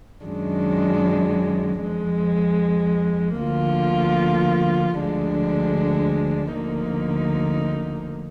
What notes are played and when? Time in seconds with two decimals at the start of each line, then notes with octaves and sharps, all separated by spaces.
0.24 F#2 D#3 G#3 D4
1.81 F2 F3 G#3
3.39 D2 D3 F3 A#3 F4
4.96 D2 D3 F3 G#3 D4
6.53 D2 D3 F3 A#3 D#4